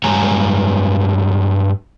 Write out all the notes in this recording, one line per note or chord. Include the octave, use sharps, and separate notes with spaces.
G2 F#3 G#3 C#5 G#5 A#5